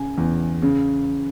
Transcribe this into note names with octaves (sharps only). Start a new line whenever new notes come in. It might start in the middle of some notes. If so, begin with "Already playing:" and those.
Already playing: C#3 G#5
E2
C#3